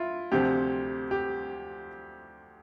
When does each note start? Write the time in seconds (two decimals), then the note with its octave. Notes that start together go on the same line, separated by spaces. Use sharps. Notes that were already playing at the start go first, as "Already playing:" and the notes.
Already playing: E4 F4
0.32 D2 C3 F3 G4
1.11 G4